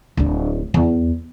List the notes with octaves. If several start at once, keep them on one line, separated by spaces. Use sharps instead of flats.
D1 D4
E2